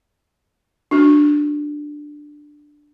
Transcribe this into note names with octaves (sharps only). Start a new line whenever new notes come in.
D4 F#4